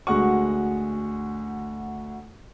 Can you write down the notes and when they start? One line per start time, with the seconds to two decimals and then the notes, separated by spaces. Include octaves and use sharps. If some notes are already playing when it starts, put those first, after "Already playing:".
0.07 D2 G#3 F#4 F#5 C#6